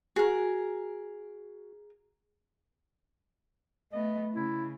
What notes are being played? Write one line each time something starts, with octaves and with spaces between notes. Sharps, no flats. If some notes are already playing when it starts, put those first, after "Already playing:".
F#4 G#4 A#4
A3 B3 D#5
C#3 E4